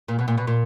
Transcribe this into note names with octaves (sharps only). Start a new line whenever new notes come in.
A#2
B2
A#2
B2
A#2